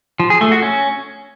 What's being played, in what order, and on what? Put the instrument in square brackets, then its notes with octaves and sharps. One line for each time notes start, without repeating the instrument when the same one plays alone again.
[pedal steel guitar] F3
G#4
A3
F#4
C#4